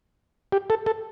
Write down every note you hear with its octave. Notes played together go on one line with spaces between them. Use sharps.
G4
A4
A4